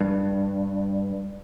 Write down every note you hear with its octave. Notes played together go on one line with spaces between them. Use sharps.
G2